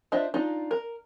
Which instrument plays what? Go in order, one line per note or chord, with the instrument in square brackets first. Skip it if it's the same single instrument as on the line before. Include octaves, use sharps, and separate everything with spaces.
[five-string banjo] D4 F4 C5 D#5 E5
D4 D#4 F4
A#4